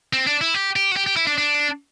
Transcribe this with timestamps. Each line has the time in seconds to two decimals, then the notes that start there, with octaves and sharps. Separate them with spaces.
0.13 C4
0.27 D4
0.41 E4
0.54 G4
0.76 G4
0.92 F#4
0.97 G4
1.07 G4
1.17 E4
1.27 D4
1.38 D4